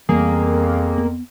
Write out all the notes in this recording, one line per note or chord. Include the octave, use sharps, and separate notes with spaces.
F2 E3 G3 A#3 B3 G#4
B3